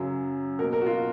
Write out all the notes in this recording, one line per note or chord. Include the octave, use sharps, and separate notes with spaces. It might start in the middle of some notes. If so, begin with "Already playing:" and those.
Already playing: F#2 C#3 F#3
B2 A#3 A#4
A#4
F#4
F4